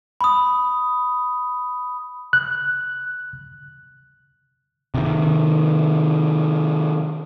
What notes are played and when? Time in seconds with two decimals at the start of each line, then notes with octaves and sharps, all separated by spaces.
0.21 B5 D#6
2.33 F#6
4.94 C3 D#3